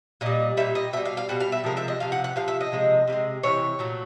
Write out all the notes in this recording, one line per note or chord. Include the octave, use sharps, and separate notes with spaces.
A#2 G3 D#5
A#2 G3 E5
D#5
B2 G3 E5
F5
F5
B2 G3 F#5
F5
E5
C3 F3 G#3 A#4
E5
D#5
C3 F3 F5
F#5
F#5
C3 F3 F5
E5
D#5
C3 F3 G#3
C3 E3 G#3
C3 E3 C#5
A#2 F#3 A3